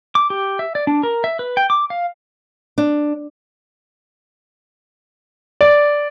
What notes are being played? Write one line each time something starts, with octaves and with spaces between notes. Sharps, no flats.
D6
G4
E5
D5
D4
A#4
E5
B4
G5
D6
F5
D4
D5